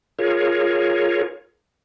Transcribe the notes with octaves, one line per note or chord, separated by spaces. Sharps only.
F4 G#4 A#4 C#5